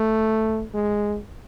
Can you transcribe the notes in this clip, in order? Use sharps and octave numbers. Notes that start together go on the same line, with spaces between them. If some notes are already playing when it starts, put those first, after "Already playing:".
Already playing: A3
G#3